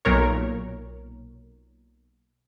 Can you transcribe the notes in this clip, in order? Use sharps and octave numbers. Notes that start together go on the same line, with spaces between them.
B1 A#2 A#4 C#5